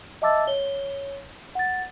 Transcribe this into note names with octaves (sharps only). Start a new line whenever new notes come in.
D#5 E5 A5 D6 E6 A6
C#5 G7
F#5 A6